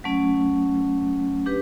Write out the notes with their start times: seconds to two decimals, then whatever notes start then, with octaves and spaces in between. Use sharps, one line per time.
0.04 F#3 A3 C#4
1.46 D4 G4 B4